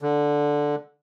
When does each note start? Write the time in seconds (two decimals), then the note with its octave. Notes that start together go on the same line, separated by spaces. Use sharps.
0.02 D3